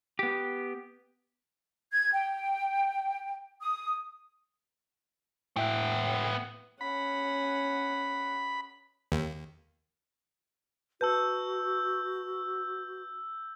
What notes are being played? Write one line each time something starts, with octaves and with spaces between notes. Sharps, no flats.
B3 G4
G#6
G5
D#6
A2 B3 E5 G5 F#6
C#4 F#5 B5
D#2
F#4 B4 A5 E6 G6